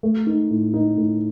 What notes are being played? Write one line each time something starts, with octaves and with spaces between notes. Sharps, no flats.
A3
D#4
A2
D#4
A2